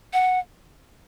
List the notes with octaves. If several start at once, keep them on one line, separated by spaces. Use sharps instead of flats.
F#5